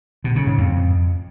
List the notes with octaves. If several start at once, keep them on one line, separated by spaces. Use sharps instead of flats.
B2
C#3
G#2
F2